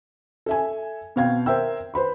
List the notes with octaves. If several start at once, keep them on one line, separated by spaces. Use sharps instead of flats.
A4 E5 G#5
B2 C4 F5 G5 G#6
A#4 C5 E5 G5 E6
B4 C5 B5 C6